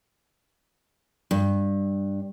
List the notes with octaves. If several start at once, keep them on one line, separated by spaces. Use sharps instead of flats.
G2